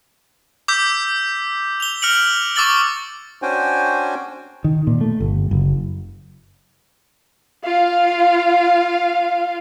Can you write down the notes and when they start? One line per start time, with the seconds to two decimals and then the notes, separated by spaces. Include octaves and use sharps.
0.68 D6 E6 G6 B6
1.80 F7 G7
2.02 F6 A#6 C#7 D7 F7 F#7
2.55 C#6 D6 E6 A6 F#7 G7
3.42 C#4 D4 F#4 C5 G5 G#5
4.64 D#3
4.87 A#2
5.01 A3
5.20 G1
5.51 F#1
7.64 F4 F5